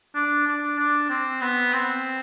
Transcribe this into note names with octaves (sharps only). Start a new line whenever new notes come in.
D4
D4
D4
C4
B3
C4